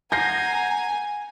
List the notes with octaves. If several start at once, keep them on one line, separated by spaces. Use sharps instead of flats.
F#5 G#5 A#5 G6 A#6 C7